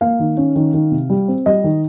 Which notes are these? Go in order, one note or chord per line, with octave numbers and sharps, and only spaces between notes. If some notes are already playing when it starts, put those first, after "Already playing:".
A#3 F5
D#3
C#4
D#3
D#3
C3
G3
C4
G3 D#5
D#3